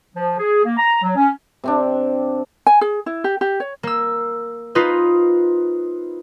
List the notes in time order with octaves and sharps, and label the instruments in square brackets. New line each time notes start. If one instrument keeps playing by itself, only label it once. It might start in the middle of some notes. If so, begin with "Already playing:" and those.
[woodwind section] F3
G#4
A#3
A#5
F#3
C#4
[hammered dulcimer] C3 C4 D4
[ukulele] G#5
G#4
E4
G4
G4
C#5
[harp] A#3 E6
D#4 F4 B4 C5